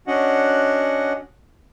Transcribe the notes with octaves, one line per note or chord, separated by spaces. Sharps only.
C#4 D4 F#4 D#5 F#5